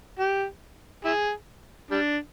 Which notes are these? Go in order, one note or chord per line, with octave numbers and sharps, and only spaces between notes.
G4
E4 G#4
G3 D4